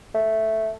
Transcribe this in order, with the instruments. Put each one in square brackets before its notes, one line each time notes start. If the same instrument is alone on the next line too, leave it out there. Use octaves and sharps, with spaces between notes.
[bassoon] A3